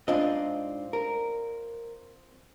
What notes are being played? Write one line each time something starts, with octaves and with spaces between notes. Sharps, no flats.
G#2 C4 D4 F4 D5 D#5
A#4